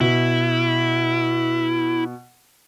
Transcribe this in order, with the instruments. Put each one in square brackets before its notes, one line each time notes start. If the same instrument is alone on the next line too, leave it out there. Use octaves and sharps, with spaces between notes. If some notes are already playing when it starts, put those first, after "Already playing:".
[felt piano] B2 [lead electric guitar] E4